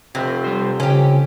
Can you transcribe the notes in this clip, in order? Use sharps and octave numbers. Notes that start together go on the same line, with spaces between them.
F1 C3
G3 C5
F2 C#3 C#4 G4